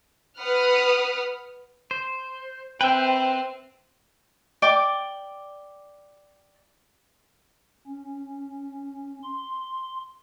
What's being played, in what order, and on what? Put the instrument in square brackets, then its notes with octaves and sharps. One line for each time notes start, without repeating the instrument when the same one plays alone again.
[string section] B4 F#5 D#6 F6
[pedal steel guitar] C5
[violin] C4 [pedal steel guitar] B4 E5 [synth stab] G5
[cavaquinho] D5 G5 D6
[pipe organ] C#4
C6